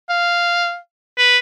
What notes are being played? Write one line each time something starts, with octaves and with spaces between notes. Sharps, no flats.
F5
B4